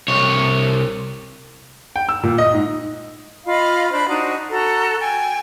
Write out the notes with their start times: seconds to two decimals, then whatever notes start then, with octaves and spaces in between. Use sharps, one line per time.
0.08 C2 C#5
1.96 G5
2.09 E6
2.23 A#2
2.38 D#5
2.53 G#2
3.46 F4 D#5 F5 B5
3.92 D4 C5 B5
4.08 D4 D#4 F#4 C5
4.49 F#4 A4 A#5
5.00 G5 G#5